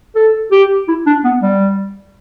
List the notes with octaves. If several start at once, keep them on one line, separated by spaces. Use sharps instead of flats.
A4
G4
E4
D4
B3
G3